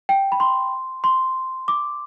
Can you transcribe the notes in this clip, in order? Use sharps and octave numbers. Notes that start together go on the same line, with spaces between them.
G5
B5
C6
C6
D6